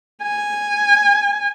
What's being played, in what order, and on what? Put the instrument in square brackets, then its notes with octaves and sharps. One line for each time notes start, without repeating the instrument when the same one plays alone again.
[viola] G#5